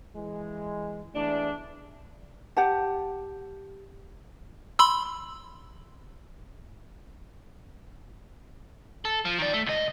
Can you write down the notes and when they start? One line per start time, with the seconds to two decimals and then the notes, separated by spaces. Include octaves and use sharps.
0.15 E3 G#3
1.15 E2 E3 A3 D4
2.57 G4 F#5 A5
4.79 B5 C6 E6
9.05 A4
9.25 F3
9.38 D#3 D5
9.53 A3
9.66 C#2 D#5